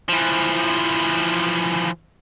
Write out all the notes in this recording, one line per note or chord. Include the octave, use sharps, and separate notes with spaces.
E3 F3